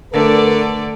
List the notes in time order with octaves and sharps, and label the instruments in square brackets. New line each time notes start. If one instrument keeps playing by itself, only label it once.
[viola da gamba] D3 A3 D5 [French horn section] A#4 B4